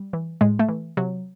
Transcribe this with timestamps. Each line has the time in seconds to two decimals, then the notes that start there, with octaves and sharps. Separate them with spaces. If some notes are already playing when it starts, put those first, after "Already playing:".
Already playing: G3
0.13 E3
0.41 A2 G#3
0.59 A3
0.69 E3
0.97 C3 F#3